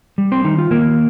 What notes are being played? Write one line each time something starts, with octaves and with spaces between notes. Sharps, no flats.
G3
C4 C5
D#3 D#4
F4
D#3 A#3 A#4